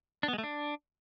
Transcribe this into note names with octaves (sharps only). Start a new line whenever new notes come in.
D4
B3
G#3
A3
D4